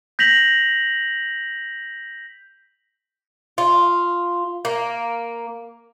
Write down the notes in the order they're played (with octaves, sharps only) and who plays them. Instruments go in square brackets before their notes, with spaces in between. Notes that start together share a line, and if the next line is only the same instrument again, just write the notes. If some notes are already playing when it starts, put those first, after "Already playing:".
[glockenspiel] G6 A#6 B6 F7 F#7
[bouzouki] F4
A#3